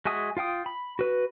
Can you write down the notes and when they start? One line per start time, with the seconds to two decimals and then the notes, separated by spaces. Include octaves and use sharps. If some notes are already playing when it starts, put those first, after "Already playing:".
0.05 G#3 F#4 E5 G#5 D#6
0.37 F4 F5 G5 D#6
0.66 B5
0.99 F#4 B4